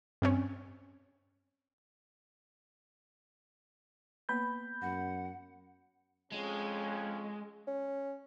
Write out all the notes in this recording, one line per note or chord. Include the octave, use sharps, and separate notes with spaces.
G2 C4 C#4
A#3 B3 B4 B5 G6
F#2 F#5
F2 G#3 C#4
C#4